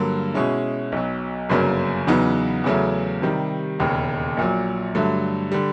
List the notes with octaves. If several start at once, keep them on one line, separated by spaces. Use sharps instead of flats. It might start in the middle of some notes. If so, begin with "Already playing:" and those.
Already playing: G2 D3 F#3 A#3
B2 G#3 C#4 E4
B1 B2 F#3
G1 F#2 C#3 F#3 A#3
E2 C#3 F#3 B3 D#4
E2 C#3 F#3 A3
C3 D#3 G3
E1 D#2 C#3
A#1 A#2 F#3
G2 D3 F#3 A3
D3 G3